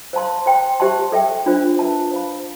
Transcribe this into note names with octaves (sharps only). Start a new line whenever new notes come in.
C5 F5 A5 C6
C5 G5 C6
G4 C5 E5 A5 C6
A4 E5 G5
D4 F4 C5
B4 E5 A5
C5 F5 B5